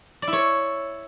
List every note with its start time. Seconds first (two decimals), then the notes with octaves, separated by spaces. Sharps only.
0.22 D5
0.28 E4
0.33 C#5